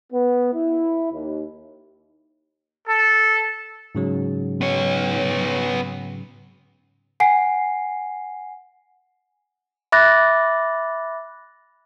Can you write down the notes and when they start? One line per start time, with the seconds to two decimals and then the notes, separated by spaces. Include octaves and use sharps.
0.12 B3
0.53 E4
1.12 D#2
2.87 A4
3.95 G#2 C#3 F#3
4.61 B3 C#5
7.20 F#5 G#5 C7
9.92 E5 B5 D6 F#6 A6 A#6